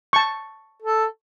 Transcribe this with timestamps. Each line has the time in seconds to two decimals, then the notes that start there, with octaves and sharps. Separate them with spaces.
0.13 A5 C#6
0.82 A4